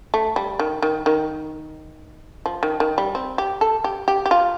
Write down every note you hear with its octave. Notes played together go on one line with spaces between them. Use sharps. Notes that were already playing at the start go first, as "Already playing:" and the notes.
A3
G3
D#3
D#3
D#3
F3
D#3
D#3
G3
C4
G4
A4
G4
G4
G4
F4